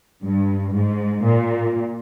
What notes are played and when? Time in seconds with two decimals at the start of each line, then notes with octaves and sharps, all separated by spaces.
0.23 G2
0.74 G#2
1.25 A#2